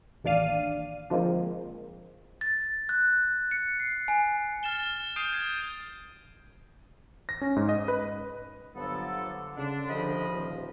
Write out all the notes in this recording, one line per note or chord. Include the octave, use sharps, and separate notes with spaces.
A1 D#2 D4 D5 F5 D#7
D3 F3 G#3 A#3 C4
A6
F#6
C#7
C7
G#5
F6 A6 E7 G7
D#6 G6 C7 D7 D#7
G#6
A#6
C#4
G#2
D#5
B4
G1 F3 F#3 B3 A4
D3
C#3 D4
C2 D3 F3 D#5 B5
D#1